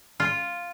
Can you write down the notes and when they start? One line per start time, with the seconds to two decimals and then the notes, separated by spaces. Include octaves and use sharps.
0.20 F4